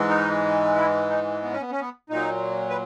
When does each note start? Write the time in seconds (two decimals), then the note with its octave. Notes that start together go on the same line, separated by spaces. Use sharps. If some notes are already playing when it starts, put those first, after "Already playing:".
Already playing: G#2 E3 G#3
0.09 D#4
0.76 E4
1.10 D#4
1.43 B3
1.52 C#4
1.61 B3
1.71 C#4
1.81 B3
2.10 A#2 F#3 D#4
2.70 B4